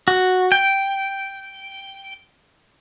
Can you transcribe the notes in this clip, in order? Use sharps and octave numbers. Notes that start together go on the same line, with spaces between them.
F#4
G5